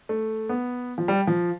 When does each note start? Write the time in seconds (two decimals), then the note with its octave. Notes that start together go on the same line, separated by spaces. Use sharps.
0.09 A3
0.49 B3
0.98 F3
1.08 G3
1.27 F3